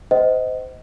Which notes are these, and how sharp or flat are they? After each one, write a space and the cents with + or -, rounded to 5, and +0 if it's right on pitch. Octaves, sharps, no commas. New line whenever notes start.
C5 -25 D#5 +15 F#5 +35